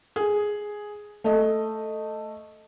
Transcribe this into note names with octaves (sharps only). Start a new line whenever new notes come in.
G#4
A3 D#5